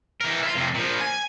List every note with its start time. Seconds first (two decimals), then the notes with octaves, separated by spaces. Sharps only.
0.21 E3 A#4
0.43 E4 F4
0.55 F2 C3
0.74 A#2 F3
1.01 G#5